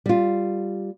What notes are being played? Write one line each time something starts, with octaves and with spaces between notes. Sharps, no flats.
G3 F4